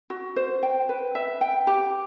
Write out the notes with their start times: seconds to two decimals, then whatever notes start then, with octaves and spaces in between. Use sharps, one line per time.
0.10 F#4
0.36 C5
0.63 G5
0.89 B4
1.15 E5
1.41 G5
1.67 G4